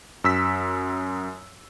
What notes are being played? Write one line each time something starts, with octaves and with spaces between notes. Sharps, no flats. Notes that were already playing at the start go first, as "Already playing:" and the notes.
F#2 E6 B6